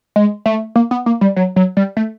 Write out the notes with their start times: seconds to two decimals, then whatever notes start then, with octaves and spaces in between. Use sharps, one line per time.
0.16 G#3
0.46 A3
0.76 A#3
0.91 B3
1.06 A#3
1.21 G3
1.36 F#3
1.56 F#3
1.77 G3
1.97 A3